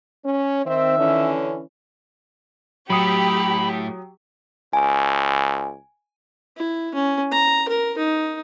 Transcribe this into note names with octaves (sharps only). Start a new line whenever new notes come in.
C#4
D#3 C4 E5
D3 E3 C#4
A2 F#3 G4 B5 D#6
C#2 G#5
E4
C#4
A#5
A#4
D#4